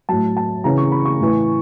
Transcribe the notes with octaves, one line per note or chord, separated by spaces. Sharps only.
A2 F#3 A5
A5
C#3 E3 A#5
C#6
B5
C#6
A2 E3